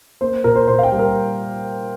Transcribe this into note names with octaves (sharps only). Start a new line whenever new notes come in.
A#3 C5
A#2 A#4
C5
A#2 C5
F5
G5
G3
A#4